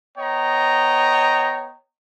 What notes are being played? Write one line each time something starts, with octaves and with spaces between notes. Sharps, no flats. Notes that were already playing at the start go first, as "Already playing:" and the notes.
B3 C#5 D#5 G5 A#5